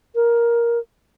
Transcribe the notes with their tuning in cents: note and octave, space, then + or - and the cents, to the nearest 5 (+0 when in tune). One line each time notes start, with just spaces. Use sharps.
A#4 +10